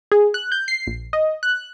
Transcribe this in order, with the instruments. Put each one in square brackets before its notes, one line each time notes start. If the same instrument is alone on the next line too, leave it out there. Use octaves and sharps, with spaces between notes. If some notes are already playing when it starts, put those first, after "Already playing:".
[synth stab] G#4
F#6
G6
C7
A#1
D#5
F#6